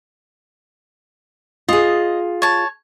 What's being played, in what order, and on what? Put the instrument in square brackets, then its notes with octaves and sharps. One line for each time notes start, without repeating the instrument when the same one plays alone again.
[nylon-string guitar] F4 G#4 [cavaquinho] D#5
[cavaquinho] C#5 A5